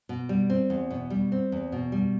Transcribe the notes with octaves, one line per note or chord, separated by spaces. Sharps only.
B2
G3
C4
E2
B2
G3
C4
E2
B2
G3